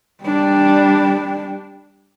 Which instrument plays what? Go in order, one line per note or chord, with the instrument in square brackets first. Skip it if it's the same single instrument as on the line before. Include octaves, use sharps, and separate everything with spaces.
[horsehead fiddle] G3 D4